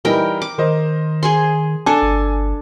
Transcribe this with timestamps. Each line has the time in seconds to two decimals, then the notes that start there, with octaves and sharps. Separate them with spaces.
0.05 E3 G3 D#4 A#4 G5
0.42 D6
0.58 D#3 A#4 C5 D#5
1.23 G#4 G#5 C6
1.86 D4 A4 G#5
2.02 G1